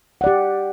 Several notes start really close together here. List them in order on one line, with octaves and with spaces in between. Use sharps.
F#5 D5 G4